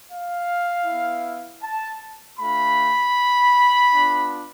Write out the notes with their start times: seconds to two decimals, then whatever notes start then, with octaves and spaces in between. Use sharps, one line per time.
0.10 F5
0.86 B3 E4
1.62 A5
2.38 A3 D4 F4 B5
3.91 B3 D4 F4